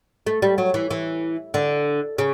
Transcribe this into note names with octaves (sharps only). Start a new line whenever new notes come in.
A3
G3
F#3
E3
E3
D3
C#3